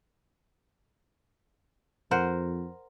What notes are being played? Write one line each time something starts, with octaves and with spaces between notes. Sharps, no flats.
F2 A#4 C5 F#5